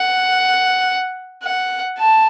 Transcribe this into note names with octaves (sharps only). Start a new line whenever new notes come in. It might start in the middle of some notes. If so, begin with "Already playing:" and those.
Already playing: F#5
F#5
A5